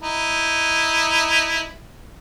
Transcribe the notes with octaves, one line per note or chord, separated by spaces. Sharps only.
D#4 E4